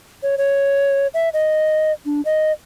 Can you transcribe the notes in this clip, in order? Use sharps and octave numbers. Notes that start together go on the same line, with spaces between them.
C#5
C#5
E5
D#5
D4
D#5